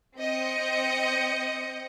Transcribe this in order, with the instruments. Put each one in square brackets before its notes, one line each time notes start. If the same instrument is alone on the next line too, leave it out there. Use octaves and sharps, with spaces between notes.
[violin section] C4 D#5 G6 C#7